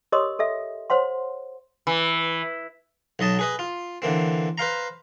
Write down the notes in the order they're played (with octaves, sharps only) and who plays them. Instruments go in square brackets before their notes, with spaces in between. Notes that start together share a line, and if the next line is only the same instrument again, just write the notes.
[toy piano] G4 A#4 C#5 D#5 C6 D#6
A4 D#5 E5
C5 C#5 F#5 C6
[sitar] E3
[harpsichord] B1 F#3 D#5 A5
G#4 B4 D#5
F4
D3 E3 A#3 C4
B4 C5 F5 A#5